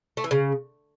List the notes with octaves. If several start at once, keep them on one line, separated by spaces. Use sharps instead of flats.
A3
E3
C#3